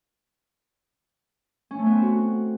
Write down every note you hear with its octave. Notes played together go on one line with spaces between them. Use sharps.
C#4
A3
B3
C4
F#4